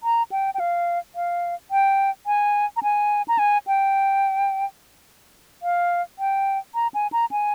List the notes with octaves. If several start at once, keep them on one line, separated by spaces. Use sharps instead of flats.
A#5
G5
G5
F5
F5
G5
G#5
A#5
G#5
A#5
G#5
G5
F5
G5
A#5
G#5
A#5
G#5